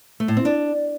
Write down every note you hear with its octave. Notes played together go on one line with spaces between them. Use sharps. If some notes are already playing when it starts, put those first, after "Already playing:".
A3
A2
C4
D4